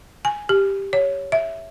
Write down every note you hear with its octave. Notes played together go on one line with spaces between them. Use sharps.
G#5
G4
C#5
E5